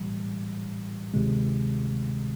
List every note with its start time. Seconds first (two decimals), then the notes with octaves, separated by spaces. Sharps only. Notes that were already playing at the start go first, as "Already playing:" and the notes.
Already playing: A2 E3 G3
1.14 D2 C3 D#3 G#3